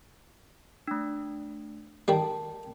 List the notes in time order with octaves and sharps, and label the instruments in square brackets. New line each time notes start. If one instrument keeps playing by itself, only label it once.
[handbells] A3 D4
[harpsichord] D#3 G3 [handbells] A#4 A5